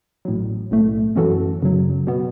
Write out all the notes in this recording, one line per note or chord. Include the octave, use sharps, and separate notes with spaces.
A1 A2 F#3
B1 A2 A3
F#2 E3 C#4 F#4 A4
F#2 C#3 F#3
B2 B3